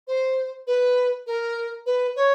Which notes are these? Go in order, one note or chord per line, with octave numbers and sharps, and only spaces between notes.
C5
B4
A#4
B4
C#5